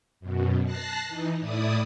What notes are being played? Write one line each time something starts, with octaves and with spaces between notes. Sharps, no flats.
F#2 B2
A5 F#6 A#6 C7
E3 D#4
A2 E4 D5 D#6